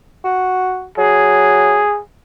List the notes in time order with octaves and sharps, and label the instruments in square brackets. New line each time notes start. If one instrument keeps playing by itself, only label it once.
[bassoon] F#4
[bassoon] F#3 [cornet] G#4